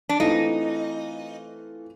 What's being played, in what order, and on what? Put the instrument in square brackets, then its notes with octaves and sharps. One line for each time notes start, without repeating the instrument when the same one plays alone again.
[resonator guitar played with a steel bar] D4
[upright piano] E3 A3 C4 F4 [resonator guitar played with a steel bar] D#4